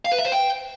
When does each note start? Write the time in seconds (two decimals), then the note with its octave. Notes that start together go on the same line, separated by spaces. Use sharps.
0.05 F5
0.12 B4
0.19 E5
0.25 C5
0.32 G5